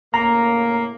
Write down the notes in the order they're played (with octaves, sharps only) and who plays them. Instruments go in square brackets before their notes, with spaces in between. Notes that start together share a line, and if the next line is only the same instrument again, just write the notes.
[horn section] A2 C#3 A#3 [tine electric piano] A#5